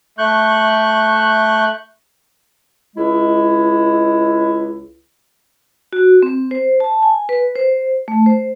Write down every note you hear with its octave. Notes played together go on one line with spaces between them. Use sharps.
A3 C#6 F#6 G6
C#2 G#3 E4
F#4
C4
C5
A5
G#5
B4
C5
A3
C5